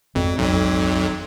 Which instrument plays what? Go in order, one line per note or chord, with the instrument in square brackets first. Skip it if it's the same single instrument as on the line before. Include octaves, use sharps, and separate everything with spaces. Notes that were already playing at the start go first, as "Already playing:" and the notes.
[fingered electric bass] G#1 [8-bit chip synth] F2
[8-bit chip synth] B1 F2